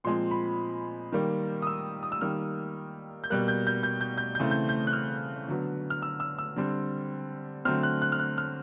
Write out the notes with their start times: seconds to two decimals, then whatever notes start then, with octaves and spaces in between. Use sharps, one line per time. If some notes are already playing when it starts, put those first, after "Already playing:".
0.04 A#2 F3 G#3 C4 C6
0.31 B5
1.12 D#3 G3 A#3
1.62 D#6
1.67 E6
2.03 D#6
2.12 E6
2.21 D#3 G3 A#3 F6
3.24 G6
3.30 B2 G3 A#3 F#6
3.48 G6
3.67 G6
3.83 G6
4.01 G6
4.18 G6
4.35 G6
4.39 C#3 E3 A3 C4
4.51 G6
4.69 G6
4.87 F#6
4.93 F6
5.48 D3 F#3 B3
5.90 F6
6.02 E6
6.20 E6
6.38 E6
6.56 D3 G3 C4
7.65 D3 F#3 A3 C4 F6
7.83 F#6
8.02 F#6
8.12 F6
8.19 F#6
8.38 F6